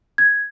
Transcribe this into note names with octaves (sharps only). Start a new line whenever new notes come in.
G#6